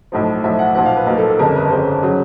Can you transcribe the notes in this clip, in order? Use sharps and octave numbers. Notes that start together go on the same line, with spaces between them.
B1 A2 F3
B1 A2 F3 E5
F#5
B1 A#2 F3 F#5
F5
B4
B1 A#2 F3 A#4
A4
A4
G1 F2 C#3 A#4
B4
G1 F2 C#3 C5
C#3 F#3